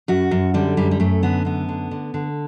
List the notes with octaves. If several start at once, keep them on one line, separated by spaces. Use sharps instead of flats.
F#2 F#4
F#2
D3 G3
F#2 G3
G3
F#2 A3
D3 B3
F#2 B3
D3
D3
D3